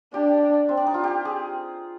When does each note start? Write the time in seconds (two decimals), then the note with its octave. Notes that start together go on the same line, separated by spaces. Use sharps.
0.14 D4 G4
0.69 C4
0.77 D4
0.87 D#4
0.94 F4
1.04 G4
1.25 G#4